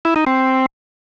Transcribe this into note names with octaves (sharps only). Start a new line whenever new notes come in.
E4
D#4
C4